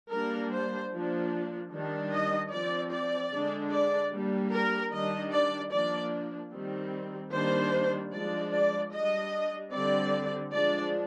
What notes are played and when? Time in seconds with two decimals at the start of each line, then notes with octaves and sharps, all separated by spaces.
0.11 G3 A#3 D4 A#4
0.51 C5
0.91 F3 A#3 D4
1.71 D#3 G3 D4
2.12 D#5
2.52 F3 C4 D5
2.91 D5
3.32 D3 G#3 D4
3.72 D5
4.12 G3 A#3 D4
4.51 A#4
4.92 D#3 G3 D4 D#5
5.32 D5
5.72 F3 A#3 D4 D5
6.52 D#3 G3 C4
7.32 D#3 G3 A#3 D4 C5
8.11 F3 G#3 D4 D5
8.53 D5
8.93 G3 D4 D#5
9.72 D3 G3 C4 D5
10.52 F3 G#3 D4 D5